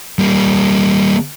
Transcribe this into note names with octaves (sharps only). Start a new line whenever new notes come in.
G3 A#3